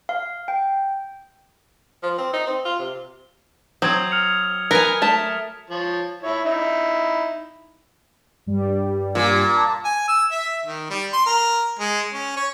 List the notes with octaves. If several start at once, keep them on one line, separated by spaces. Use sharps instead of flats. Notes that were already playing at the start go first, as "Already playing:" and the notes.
F5
G5
F3
C4
D#4
C4
F4
C3
F#3 C4 D#6 G#6
F6 C#7 F7
A#4 B4 G#5
A3 A5 A6 B6
F3 C#5
E4 C#5
D#4 E4
G2 G3
A#2
A5
G#5
E6
E5
D#3
G3
C6
A#4
G#3
C#4
C#5